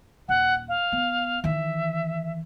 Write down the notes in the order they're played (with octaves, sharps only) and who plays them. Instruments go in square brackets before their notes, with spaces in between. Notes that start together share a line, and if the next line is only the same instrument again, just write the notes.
[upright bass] D#1 [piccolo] F#5
[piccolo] F5
[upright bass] B3
[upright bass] D#3 E3 [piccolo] E5